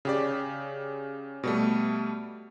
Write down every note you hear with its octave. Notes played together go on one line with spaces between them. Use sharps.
C#3 G4 D5
B2 G3 A3